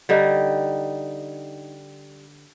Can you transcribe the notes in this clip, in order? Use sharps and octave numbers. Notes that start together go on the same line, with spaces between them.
D3 G3 D#4